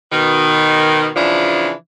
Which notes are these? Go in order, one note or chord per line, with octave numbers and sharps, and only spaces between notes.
B2 D#3
C#3 E3 F3 D4